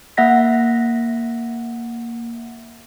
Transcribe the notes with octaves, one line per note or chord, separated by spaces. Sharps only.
A#3 E5 F#5 A#6 B6